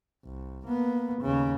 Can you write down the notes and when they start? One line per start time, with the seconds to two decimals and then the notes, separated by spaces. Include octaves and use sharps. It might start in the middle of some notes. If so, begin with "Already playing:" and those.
0.25 C2
0.66 A#3 B3
1.22 D#2 C#3